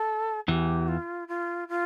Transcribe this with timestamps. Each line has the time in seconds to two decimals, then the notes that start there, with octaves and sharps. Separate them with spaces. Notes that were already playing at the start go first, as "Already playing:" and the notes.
Already playing: A4
0.48 E2 E3 G4
0.88 F4
1.28 F4
1.69 F4